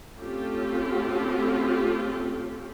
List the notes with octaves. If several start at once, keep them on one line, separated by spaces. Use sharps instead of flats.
A3 C4 C#4 F4 G4 A4